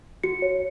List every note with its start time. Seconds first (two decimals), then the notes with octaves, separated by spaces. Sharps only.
0.24 F#4 C#7
0.42 C#5